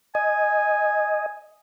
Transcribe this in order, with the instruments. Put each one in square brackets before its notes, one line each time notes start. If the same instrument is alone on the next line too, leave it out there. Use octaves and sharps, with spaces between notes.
[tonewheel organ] D#5 [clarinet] G#5